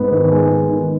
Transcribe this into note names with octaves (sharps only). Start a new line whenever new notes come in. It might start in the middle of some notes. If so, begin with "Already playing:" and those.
Already playing: G#2 B3 B4
D#3
G#3
B3
D#3